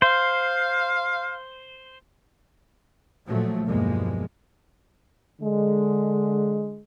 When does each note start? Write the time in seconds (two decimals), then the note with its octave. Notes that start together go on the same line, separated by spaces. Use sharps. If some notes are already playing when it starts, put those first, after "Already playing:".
0.02 C5 F5
3.26 A#2 F3 F#3 A3
3.66 B1 E2 G2 F3 G#3 A#3
5.41 D3 G#3